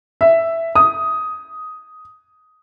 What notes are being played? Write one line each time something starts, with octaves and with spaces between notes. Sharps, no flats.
E5
D#6